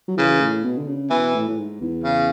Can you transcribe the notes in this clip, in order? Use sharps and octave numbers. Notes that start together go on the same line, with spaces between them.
F#3
C#3 E3
A2
B2
D3
C#3
B2 E3
A2
A2
G#2
E2
C#3